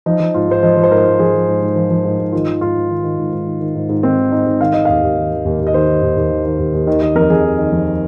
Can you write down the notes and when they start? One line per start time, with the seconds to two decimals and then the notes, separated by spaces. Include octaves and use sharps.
0.06 F3 D#4
0.20 F3
0.34 G#2 F4
0.48 G#2 C5
0.63 F3 D#5
0.77 F3
0.83 C5
0.91 G#2 A#4
1.05 G#2
1.19 F3 G#4
1.34 F3
1.48 G#2
1.62 G#2
1.76 F3
1.90 F3
2.05 G#2
2.19 G#2
2.33 D#3 F4
2.48 D#3
2.61 G#2 F4
2.76 G#2
2.90 D#3
3.04 D#3
3.19 G#2
3.33 G#2
3.47 D#3
3.61 D#3
3.75 G#2
3.89 G#2
4.03 D#3 C4
4.18 D#3
4.32 G#2 D#4
4.46 G#2
4.60 D#3 F5
4.73 D#3 D#5
4.85 D#2 F5
5.03 D#2
5.17 D#3
5.31 D#3
5.45 D#2
5.59 D#2
5.67 D#5
5.74 D#3 C5
5.87 D#3
6.02 D#2
6.17 D#2
6.30 D#3
6.45 D#3
6.59 D#2
6.73 D#2
6.87 D#3
7.02 D#3 D#5
7.15 F2 A#4
7.30 F2 G#4
7.44 D#3
7.59 D#3
7.72 F2